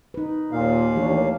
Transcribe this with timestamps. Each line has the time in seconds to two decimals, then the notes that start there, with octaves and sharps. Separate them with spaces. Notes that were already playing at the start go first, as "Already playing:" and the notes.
0.14 D#4 B4
0.52 D#2 A#2 F5
0.96 D#3 E3 A3 D4 G4 C#5